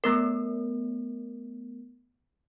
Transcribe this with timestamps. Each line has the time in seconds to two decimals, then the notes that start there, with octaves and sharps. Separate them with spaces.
0.04 A3 B3 A#4